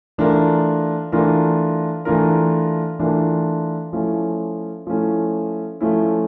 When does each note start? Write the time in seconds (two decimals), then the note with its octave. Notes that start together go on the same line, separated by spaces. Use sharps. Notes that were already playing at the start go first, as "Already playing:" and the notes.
0.18 E3 A3 D4 F4 A#4
1.12 E3 A3 D4 F4 A#4
2.05 E3 A3 D4 F4 A#4
2.99 E3 A3 D4 F4 A#4
3.93 F3 A3 C#4 E4
4.87 F3 A3 C#4 E4
5.81 F3 A3 C#4 E4